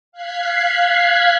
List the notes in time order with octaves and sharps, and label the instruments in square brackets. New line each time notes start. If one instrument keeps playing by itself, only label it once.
[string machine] F5 F#6 G#6 B6 C7